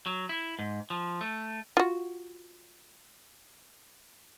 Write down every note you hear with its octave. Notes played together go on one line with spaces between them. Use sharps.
F#3
E4
G#2
F3
A3
F4 F#4